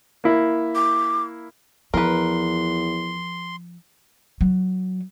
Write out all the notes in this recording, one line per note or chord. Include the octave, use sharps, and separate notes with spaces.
A#3 E4
D6
E2 F3 A#4 B4 C6
F#3